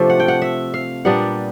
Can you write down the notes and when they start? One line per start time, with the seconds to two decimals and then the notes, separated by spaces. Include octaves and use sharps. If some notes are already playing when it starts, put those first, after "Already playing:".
Already playing: C3 F3 A3 D4
0.10 F#5
0.20 G5
0.28 F#5
0.42 E5
0.74 F5
1.05 A#2 G3 B3 D4 F#5